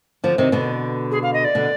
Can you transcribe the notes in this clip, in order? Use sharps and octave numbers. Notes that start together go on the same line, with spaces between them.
D3 F3
C3 D#3
B2 D3
G#4
F5
D#5
D5
B2 D3